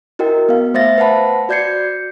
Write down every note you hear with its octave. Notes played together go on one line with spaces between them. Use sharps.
E4 F#4 A#4 D#5 G5
B3 F5
A3 C5 E5 F5 A6 A#6
B4 C5 F#5 A5 B5
F#4 D5 G6 G#6 C7 C#7